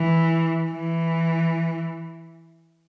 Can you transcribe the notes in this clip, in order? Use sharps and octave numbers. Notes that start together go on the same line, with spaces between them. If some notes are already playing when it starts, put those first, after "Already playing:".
Already playing: E3
E3